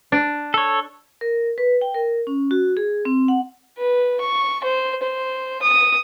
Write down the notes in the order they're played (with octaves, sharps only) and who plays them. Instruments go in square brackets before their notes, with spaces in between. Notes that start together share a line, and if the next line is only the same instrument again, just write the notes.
[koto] D4
[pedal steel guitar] A4 C#5
[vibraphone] A#4
B4
G5
A#4
C#4
F#4
G#4
C4
F#5
[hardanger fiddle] B4
C#6
C5
C5
D#6